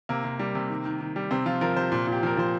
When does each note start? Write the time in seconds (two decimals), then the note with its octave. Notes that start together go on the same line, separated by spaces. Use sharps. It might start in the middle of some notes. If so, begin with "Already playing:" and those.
0.09 C3 A#3
0.24 C3
0.39 G3
0.55 C3
0.69 D#3
0.85 D#3
1.01 D#3
1.16 G3
1.31 C3 C4
1.46 F3 F4
1.61 F3 A#4
1.76 C3 C5
1.92 A#2
2.07 A#2
2.12 G4
2.23 F3 A#4
2.37 F3 C5